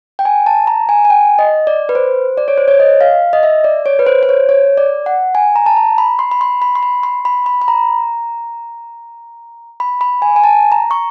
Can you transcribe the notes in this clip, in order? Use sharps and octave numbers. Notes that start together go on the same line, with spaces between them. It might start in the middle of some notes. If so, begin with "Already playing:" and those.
G5
G#5
A5
A#5
G#5
G#5
G5
D#5
D5
B4
C5
D5
C#5
C5
C#5
D#5
F5
D#5
E5
D5
C#5
B4
C5
C5
C#5
C#5
D5
F#5
G#5
A#5
A5
A#5
B5
C6
B5
C6
B5
C6
B5
C6
B5
B5
B5
A#5
B5
B5
G#5
G#5
A5
A#5
C#6